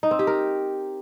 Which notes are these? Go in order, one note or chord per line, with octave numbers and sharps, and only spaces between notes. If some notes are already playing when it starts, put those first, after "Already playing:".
D#4
C4
G4
A#4